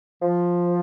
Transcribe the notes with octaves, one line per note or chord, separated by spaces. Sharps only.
F3